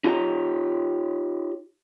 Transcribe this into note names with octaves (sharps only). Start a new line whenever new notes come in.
D#4 F4 G4 C#5 G#5 A#5